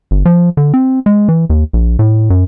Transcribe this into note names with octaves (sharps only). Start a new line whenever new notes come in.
G1
F3
D3
C4
G#3
E3
D#2
A#1
A2
F#2